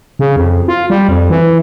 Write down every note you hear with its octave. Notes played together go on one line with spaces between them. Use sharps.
C#3
F2
F4
G3
F2
E3